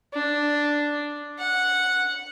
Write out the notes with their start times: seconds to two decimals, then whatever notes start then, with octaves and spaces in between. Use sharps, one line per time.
0.13 D4
1.39 F#5